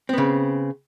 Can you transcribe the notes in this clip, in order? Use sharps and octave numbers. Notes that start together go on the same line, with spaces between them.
C#3 B3 C4